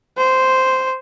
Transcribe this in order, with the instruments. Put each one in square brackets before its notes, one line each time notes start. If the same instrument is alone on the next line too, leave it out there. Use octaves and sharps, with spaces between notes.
[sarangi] C5